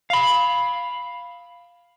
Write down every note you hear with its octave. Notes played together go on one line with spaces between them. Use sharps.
F5 B5